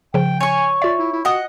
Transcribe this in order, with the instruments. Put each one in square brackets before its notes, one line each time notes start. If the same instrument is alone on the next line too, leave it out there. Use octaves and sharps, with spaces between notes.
[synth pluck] C#3 F3 [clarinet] G5
[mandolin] C#5 C#6 [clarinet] G#5
[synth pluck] F4 E5 [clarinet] D5
[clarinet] E4
E4
[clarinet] F#4 [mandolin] D#5 F#5 D#6